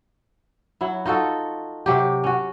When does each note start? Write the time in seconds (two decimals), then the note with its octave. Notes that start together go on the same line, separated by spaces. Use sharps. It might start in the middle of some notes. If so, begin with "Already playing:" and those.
0.81 F#3 E4
1.06 D#4 F4 F#4 A4
1.86 C3 F#3 G4
2.24 C#4 F#4